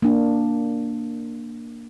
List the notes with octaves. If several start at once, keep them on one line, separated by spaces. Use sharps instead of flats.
A#3 D4